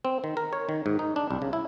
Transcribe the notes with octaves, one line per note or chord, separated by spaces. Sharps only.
C4
D#3
A#4
C#5
D#3
G#2
D#4
D4
C2
C#3
E4